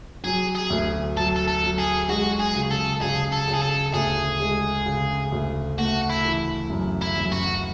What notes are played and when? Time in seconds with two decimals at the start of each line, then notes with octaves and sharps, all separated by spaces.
0.24 F#3 G#4
0.55 G#4
0.70 D2
1.17 F#3 A4
1.36 A4
1.48 A4
1.64 F#3
1.78 G#4
2.09 G#3 F#4
2.40 G#4
2.55 C#3
2.71 A4
3.02 C#3 G#4
3.33 A4
3.48 C#3
3.54 G#4
3.62 A4
3.94 D2 G#4
4.40 G#3
4.86 C#3
5.32 D2
5.78 A3 F#4
6.10 E4
6.25 E3
6.70 F#2
7.02 E4
7.16 F#2
7.32 F#4